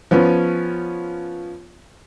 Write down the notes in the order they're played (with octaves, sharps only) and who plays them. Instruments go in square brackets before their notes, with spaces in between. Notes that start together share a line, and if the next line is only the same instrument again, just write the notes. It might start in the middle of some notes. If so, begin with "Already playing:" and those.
[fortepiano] F3 B3 C#4